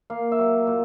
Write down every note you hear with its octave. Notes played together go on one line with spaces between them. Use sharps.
A#3 F5
E5
F#3
A#2